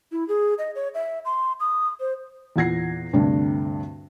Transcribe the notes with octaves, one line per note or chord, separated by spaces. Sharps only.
E4
G#4
D#5
C#5
E5
C6
D#6
C5
E2 A#2 F#5 G#6 A#6 C7
D2 G2 C3 A3 D4